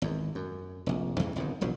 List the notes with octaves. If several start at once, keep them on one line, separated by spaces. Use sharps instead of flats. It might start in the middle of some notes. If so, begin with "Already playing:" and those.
G#1 E2
F#2
F1 A#1
E2 G2 C#3 E3
G1 C2 F#2 D#3
E1 A#1 F3 F#3